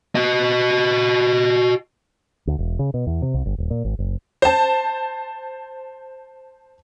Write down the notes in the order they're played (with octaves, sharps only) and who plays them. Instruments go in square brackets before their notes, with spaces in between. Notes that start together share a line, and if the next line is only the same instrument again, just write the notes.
[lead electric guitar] F#4 D#5
[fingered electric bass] D2
E1
C#3
B2
E2
C3
C2
G1
D#1
A#2
G#1
F#1
[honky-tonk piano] C5 A5